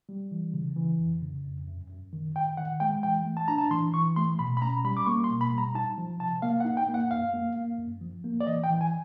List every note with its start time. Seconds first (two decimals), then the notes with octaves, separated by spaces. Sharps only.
0.09 G3
0.31 E3
0.54 C#3
0.76 E3
1.00 F2
1.22 C#3
1.45 F2
1.67 F#2
1.90 F#2
2.13 D#3
2.35 D#3 G5
2.57 D#3 F#5
2.80 G#3 G5
3.03 E3 G5
3.25 A3
3.37 A5
3.48 D4 A#5
3.58 A5
3.71 E3 C6
3.94 E3 C#6
4.16 A3 C6
4.39 B2 B5
4.57 B5
4.62 C#4 A#5
4.84 G3 B5
4.97 D6
5.06 A#3 C#6
5.24 C6
5.30 B2
5.41 B5
5.52 G3
5.58 A#5
5.75 D#4 A5
5.98 F3
6.20 C3 A5
6.42 A#3 F5
6.60 F#5
6.65 D#4
6.77 G5
6.88 A#3
6.94 F#5
7.11 F#2 F5
7.34 A#3
7.56 A#3
7.78 F#2
8.01 F3
8.24 A#3
8.41 D5
8.46 E3 D#5
8.64 G5
8.70 E3
8.81 G#5